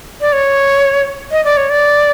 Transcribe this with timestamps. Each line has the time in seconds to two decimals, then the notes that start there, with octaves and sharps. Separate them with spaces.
0.21 D5
0.33 C#5
1.31 D#5
1.45 D5
1.57 C#5
1.70 D5